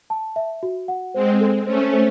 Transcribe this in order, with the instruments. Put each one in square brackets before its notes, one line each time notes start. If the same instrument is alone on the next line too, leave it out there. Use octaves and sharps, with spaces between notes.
[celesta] A5
E5
F#4
F#5
[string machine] G#3 C4 [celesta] C5
[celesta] A4
[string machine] A3 C#4 [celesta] C5
[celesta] C5